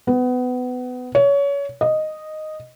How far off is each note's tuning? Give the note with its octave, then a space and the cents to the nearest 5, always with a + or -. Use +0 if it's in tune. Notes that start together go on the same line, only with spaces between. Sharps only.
B3 +25
C#5 +25
D#5 -5